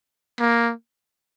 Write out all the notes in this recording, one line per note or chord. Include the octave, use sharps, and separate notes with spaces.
A#3